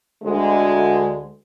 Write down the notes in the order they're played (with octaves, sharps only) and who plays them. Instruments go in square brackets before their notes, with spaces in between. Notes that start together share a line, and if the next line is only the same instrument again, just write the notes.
[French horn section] D2 G#3